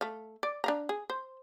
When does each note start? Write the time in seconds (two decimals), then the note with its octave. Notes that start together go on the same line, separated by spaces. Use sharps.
0.01 A3 F5
0.43 D5
0.64 D4 F5 A#5
0.89 G#4
1.10 C5